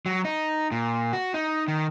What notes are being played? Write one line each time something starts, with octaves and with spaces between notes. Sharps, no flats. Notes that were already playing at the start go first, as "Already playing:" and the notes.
F#3
D#4
A#2
F#4
D#4
D#3